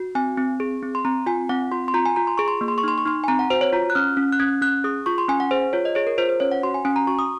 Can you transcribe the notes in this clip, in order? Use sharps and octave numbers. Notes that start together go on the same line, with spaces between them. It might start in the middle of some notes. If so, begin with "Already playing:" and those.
Already playing: F#4
C4 G#5
C4
G#4
C4
C6
C4 A#5
F4 G#5
C4 F#5
F4 C6
C6
F4 A#5
G#5
F4 A#5
C6
G#4 C#6
C6
A#3 C#6
C6
C#6
D#4 C6
C#6
D#4 C6
G#5
C4 A#5
F#5
F#4 C5
C#5
F4 A#5
F#6
C#4 F6
C#4
F#6
C#4 G#6
C#4 F#6
G#4 D#6
F4 C#6
C6
C#4 G#5
F#5
G#4 C5
F4 C#5
D#5
G#4 C#5
A#4
F4 C5
C5
C#4 C#5
F#5
F#4 C6
G#5
C#4 G#5
A#5
F#4 C#6
D#6